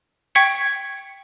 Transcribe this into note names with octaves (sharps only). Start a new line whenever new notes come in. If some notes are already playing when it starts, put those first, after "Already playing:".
G5 C#6 G#6 B6 C#7